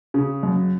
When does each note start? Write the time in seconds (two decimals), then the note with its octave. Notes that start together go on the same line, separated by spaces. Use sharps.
0.14 C#3
0.43 F#2